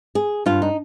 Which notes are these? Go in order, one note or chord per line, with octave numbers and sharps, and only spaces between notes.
G#4
G2 G3 F4
D#4